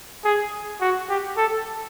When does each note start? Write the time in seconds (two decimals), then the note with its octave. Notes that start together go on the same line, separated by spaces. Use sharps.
0.25 G#4
0.81 F#4
1.09 G4
1.37 A4